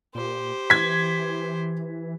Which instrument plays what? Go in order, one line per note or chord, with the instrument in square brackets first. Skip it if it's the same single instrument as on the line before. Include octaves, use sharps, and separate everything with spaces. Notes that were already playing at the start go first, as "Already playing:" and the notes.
[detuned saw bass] A#2 [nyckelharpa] G4 C5
[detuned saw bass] E3 [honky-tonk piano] G#6 B6